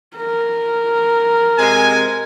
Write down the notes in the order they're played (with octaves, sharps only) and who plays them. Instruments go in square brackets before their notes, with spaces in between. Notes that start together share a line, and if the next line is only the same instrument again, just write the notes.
[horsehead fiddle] A#4
[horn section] C3 G#3 G#5